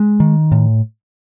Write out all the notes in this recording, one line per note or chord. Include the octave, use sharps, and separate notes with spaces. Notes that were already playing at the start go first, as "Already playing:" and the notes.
Already playing: G#3
D#3
A2